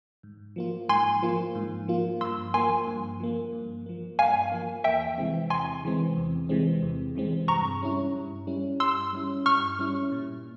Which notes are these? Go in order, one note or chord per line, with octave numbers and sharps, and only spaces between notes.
G#2
F3 A#3 F4
G#2 G#5 C6
F3 A#3 F4
G#2
F3 A#3 F4
G2 C6 E6
F3 A#3 G#5 C6
G2
F3 A#3
G2
F3 A#3
G2 F5 G#5
F3 A#3
E2 E5 G5
C3 E3 G#3 C4
E2 G#5 C6
C3 E3 G#3 C4
E2
C3 E3 G#3 C4
E2
C3 E3 G#3 C4
G2 A#5 C#6
G3 C#4 E4
G2
G3 C#4 E4
G2 C6 E6
G3 C#4 E4
G2 C#6 F6
G3 C#4 E4
A#2